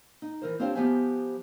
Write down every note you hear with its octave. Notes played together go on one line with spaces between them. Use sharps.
D#4
E3 A#4 C5
C4 D4 F4 G4 C5 C#5
F3 B3 G4 C5 E5 G#5